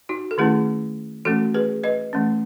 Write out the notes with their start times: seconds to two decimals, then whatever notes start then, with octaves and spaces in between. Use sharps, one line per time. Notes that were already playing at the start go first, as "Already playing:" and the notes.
0.09 D#4 F#4
0.31 A4
0.38 D#3 A3 C#4 E4 G#4
1.25 E3 A3 C#4 F#4 A4
1.54 G#4 B4
1.84 B4 D#5
2.13 E3 A3 C#4